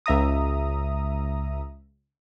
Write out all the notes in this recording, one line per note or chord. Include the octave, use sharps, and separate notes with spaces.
C#2 E5 A#5 D#6